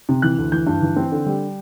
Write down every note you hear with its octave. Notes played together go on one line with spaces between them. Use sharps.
C3
E3 F#6
D2
E3 G6
G2
E3
C4
D3
G3